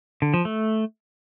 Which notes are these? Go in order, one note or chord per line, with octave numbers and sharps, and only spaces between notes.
D3
F3
A3